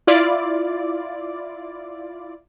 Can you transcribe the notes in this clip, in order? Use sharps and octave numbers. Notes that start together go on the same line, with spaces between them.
E4 F4 D5